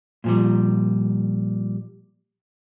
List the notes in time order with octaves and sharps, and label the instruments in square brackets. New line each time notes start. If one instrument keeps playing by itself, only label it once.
[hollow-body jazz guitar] A#2 F3 G3